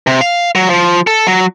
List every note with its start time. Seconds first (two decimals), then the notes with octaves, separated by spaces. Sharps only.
0.07 C3
0.21 F5
0.55 F#3
0.70 F3
1.07 A4
1.27 F#3